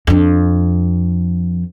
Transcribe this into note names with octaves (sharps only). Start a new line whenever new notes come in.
F2 D4